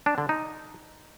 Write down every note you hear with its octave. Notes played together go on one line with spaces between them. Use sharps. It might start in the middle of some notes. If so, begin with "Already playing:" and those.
D4
D3
D#4